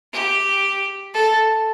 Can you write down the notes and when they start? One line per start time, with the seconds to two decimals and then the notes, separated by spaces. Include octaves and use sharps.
0.13 G4
1.14 A4